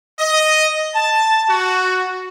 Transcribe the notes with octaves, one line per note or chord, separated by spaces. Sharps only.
D#5
A5
F#4